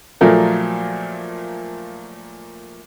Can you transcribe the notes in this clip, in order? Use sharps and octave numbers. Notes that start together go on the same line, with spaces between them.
A#2 F3 F#3 A3 A#3 A#4